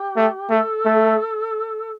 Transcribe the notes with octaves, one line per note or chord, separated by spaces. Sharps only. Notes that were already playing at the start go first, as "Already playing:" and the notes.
Already playing: G4
A3
A3 A4
A3